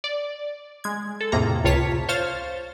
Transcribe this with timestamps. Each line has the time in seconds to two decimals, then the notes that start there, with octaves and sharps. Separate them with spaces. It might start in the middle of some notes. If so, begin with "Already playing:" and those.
0.04 D5
0.84 G#3 G#6
1.21 A4
1.32 F2 A2 C3 A#3 G#4 A#5
1.64 C#2 C3 F4 C#5 A5 B6
2.09 C5 C#5 F5 F6 A6